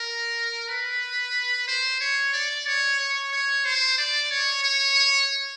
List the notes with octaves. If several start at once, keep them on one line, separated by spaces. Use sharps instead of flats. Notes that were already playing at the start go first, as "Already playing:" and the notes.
Already playing: A#4
B4
C5
C#5
D5
C#5
C#5
C#5
C5
D5
C#5
C#5